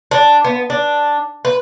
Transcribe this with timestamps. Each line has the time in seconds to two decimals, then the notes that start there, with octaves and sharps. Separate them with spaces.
0.11 D4
0.45 B3
0.70 D4
1.45 B4